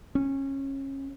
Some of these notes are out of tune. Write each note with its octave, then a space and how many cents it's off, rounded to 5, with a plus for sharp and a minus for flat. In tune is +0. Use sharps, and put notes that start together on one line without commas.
C#4 -25